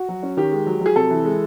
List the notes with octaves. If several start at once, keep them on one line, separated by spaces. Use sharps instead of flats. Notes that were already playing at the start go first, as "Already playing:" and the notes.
Already playing: F#4
F#3
C#4
D#3 G4
G#3
F#3
F#3 G#4
C3 A4
E3
G#3